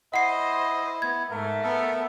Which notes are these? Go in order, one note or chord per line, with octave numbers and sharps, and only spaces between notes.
E4 C5 D#5 F#5 C7
B3 G#6
G#2 A3 A#4
B3 A4 A#4